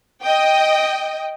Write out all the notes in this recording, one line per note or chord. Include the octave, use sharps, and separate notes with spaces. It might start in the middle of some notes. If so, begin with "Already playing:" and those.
D#5 G5